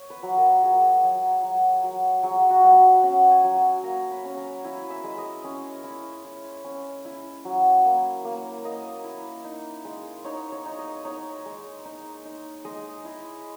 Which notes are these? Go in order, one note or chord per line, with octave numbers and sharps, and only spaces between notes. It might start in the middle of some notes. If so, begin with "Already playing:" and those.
Already playing: C#5
B4
F#3
A#4
F#3 G#4
F#3
F#3
F#3
F#3 G#4
F#4
F#3
E5
C#4 F#5
G#5
F#3
G#5
A#3 A#5
B5
C#4
A#5
E4 G#5
E5
G#3
D#5
C#4 C#5
E4
E4
C#4
E4
F#3
A#3
A#3
A#3 D#5
E4
D#4
G#3
D#4 C#5
C#5
D#4
D#5
D#4 C#5
G#3
D#4
D#4
G#3 D#5
E4